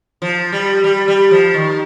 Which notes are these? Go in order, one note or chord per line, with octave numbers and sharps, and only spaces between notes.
F3
G3
G3
G3
F3
D#3